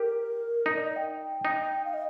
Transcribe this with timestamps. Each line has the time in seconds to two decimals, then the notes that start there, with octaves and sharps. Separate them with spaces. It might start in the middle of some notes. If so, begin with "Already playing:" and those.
Already playing: G4 A#4
0.66 D#4
0.76 D5
0.85 D#5
0.96 G5
1.45 D#4
1.85 F5
1.94 D#5